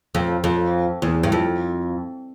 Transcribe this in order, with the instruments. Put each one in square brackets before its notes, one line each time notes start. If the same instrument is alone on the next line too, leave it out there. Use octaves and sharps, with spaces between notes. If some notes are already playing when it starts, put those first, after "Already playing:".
[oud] F2
F2
E2
G2
F2